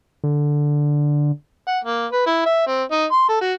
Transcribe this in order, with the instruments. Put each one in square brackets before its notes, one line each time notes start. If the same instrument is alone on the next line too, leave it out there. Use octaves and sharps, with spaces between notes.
[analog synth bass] D3
[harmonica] F#5
A#3
B4
E4
E5
C4
D#4
C6
A4
F#4